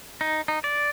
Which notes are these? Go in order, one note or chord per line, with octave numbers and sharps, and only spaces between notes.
D#4
D#4
D5